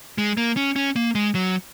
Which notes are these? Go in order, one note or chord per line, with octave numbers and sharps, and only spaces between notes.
G#3
A#3
C#4
C#4
A#3
G#3
F#3